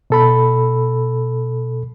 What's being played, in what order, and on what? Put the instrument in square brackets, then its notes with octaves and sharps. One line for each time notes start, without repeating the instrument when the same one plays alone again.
[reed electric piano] B2 A4 B5